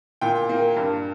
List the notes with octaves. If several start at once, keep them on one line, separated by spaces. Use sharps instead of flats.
A#2 G5
A#3
G2